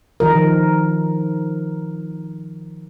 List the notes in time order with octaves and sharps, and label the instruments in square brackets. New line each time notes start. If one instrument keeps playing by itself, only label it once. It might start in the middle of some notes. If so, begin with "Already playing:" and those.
[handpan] D#3 F3 A#4